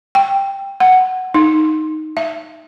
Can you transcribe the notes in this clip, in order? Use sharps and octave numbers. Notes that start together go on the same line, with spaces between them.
G5
F#5
D#4
E5